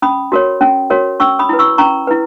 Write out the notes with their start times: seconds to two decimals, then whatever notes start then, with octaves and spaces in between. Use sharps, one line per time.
0.02 C#4 B5 D#6
0.32 F#4 A#4 C#5
0.61 C#4
0.90 F#4 A#4 C#5
1.20 C#4 C#6 E6
1.39 B5 D#6
1.49 E4 B4
1.59 C#6 E6
1.78 C#4 A#5 C#6
2.07 E4 B4